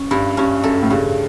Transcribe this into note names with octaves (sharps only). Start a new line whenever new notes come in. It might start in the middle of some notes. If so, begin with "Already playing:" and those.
Already playing: C#4
G2 E4
G2 C#4
F#2 A4
A2
G2 C#3